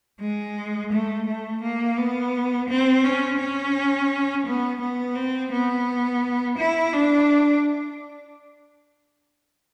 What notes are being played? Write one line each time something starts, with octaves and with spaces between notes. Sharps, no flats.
G#3
A3
A3
A#3
B3
C4
C#4
C#4
B3
B3
C4
B3
E4
D4